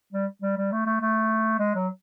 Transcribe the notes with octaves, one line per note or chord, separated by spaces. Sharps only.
G3
G3
G3
A3
A3
A3
G#3
F#3